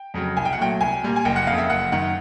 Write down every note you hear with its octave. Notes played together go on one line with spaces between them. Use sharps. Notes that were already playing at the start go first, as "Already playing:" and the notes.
Already playing: G5
F2 C#3 F#3
C2 G#5
G5
F#5
A#2 F#3 A3 G5
C2 G#5
A#2 G3 A#3
G#5
F#1 G5
F#5
F2 C#3 F5
E5
F#1 F#5
F#2 D#3 F#5